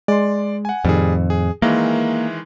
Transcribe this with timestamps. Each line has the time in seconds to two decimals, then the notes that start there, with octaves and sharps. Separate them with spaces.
0.08 G#3 D5 C6
0.65 F#5 G#5
0.85 F2 A2 D#3 G3 G#4
1.30 G#4
1.62 D#3 E3 G#3 A#3 E5